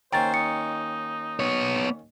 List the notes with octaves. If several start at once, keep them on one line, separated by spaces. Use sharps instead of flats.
D#2 C#4 C5 G5 A#5 A6
D#4 C#7
B3 C#5